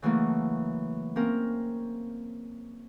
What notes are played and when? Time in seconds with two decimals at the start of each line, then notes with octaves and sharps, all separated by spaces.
0.02 C#3 E3 F#3 A3 A#3
1.16 A#3 C4 C#4 A#4